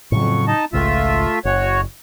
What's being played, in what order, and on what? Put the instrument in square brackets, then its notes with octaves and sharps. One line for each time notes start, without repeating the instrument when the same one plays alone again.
[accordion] F2 C#6 [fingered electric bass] A2 C#3 F#3
[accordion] D#4 D#5 A5
[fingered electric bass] G#1 C#2 [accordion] A3 F4 E5
[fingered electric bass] F#1 [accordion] F#4 C#5